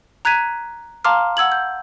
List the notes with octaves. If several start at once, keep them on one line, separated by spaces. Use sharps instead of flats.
A#5 F#6 G#6 B6 D#7
F5 A5 A#5 C6 D6 F6
F#5 E6 G#6 F#7
G6